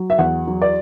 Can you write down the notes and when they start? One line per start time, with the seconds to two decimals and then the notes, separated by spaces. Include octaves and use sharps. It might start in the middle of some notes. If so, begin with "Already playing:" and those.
Already playing: F#3
0.10 E5
0.18 E2 F#5
0.47 F#3
0.62 D5